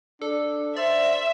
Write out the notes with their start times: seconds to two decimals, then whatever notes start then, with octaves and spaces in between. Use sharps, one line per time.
0.22 D4 A4
0.77 C5 D5 E5